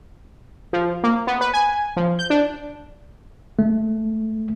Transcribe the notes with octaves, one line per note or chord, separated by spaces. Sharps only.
F3
A#3
B3
B4
G#5
F3
G6
D4
A3